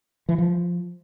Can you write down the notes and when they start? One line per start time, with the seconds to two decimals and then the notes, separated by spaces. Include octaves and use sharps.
0.29 E3
0.38 F3